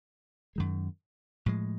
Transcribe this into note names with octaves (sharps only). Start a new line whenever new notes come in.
F#2 D#3 G#3
A2 F3 G#3